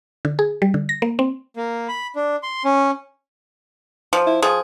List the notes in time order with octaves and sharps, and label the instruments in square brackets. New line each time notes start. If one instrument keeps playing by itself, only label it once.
[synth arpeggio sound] D3
G#4
G3
D3
A#6
A#3
C4
[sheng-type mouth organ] A#3
B5
D4
C6
C#4
[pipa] F3
[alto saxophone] E4
[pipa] F3 [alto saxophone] G#4